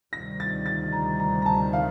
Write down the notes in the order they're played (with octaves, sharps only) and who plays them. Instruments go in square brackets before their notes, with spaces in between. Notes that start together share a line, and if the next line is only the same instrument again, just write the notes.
[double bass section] D2 C3 D#3 G3 [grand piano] A#6
[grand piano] A6
A6
A#5
A#5
A#5
A5
F5